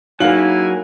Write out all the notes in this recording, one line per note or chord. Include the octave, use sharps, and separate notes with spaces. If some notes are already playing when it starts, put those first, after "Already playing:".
F#3 A#3 D#4 E4 F5 G#5 F#7